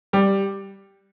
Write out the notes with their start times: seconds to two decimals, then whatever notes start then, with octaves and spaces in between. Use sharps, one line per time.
0.13 G3